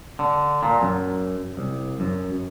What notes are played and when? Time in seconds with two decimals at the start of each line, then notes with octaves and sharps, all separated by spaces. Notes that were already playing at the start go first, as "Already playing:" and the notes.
0.19 D3
0.63 A#2
0.82 F#2
1.57 C2
2.00 F#2